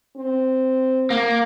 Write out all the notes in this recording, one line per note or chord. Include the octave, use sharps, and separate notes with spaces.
C4
A#3